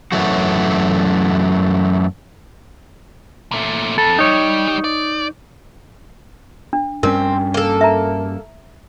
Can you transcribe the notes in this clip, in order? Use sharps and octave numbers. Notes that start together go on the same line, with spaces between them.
F#2 E3 F#3 A3 F#4
A#2 A3
F2 A4
G3 D#4 G4 C#5
D5
D4
G2 G3 C4 C#4 A#4
A#3 A4
E5 A#5